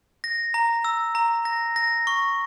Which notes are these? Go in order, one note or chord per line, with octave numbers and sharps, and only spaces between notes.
A#6
A#5
E6
A#5
A#6
A#6
C#6